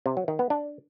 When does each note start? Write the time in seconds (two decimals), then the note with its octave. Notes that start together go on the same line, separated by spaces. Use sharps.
0.06 C3
0.17 F#3
0.28 D#3
0.39 B3
0.50 D4